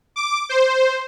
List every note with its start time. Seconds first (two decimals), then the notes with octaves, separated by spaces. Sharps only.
0.16 D6
0.49 C5